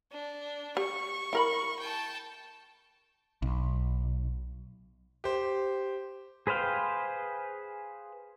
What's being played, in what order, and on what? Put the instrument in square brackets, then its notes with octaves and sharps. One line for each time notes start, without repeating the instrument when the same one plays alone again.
[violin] D4
[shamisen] G4 [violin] C#6
[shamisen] E4 A#4 B5
[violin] G5 A5
[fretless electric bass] B1
[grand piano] G4 C5
[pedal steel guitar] G#4 B4 C5 F5 G5